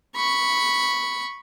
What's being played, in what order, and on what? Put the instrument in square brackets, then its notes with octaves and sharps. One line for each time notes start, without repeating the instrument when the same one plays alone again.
[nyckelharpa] B5 C#6